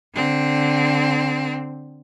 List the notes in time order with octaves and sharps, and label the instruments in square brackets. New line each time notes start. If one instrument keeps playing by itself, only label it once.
[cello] D3 C4